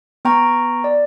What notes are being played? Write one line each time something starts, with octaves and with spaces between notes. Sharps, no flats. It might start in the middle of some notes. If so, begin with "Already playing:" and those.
B3 G5 A#5 C#6
D5